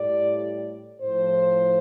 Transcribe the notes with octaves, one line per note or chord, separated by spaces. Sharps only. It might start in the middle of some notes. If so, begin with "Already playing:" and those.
Already playing: A2 G3 D5
A2 F3 C5